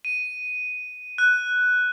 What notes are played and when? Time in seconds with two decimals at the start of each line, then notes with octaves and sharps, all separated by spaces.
0.05 D#7
1.18 F#6